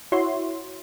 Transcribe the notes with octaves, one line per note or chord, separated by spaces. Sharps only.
E4 F#4 C#5 E5 C6